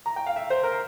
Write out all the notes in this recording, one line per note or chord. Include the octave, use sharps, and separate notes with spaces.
A#5
G5
F5
E5
C5
A#4